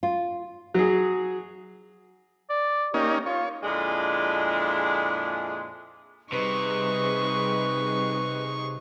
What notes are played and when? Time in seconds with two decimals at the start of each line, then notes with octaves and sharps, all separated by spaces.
0.03 F4
0.74 F#3 G#4
2.50 D5
2.94 A#3 C#4 D#4 G4
3.26 F4 C#5
3.64 F2 A#2 G#3 D4 E4 G#4
6.32 C3 G3 D#4 G#4 B4 C#6